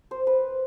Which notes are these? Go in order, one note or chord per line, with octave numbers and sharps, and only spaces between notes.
C5
B4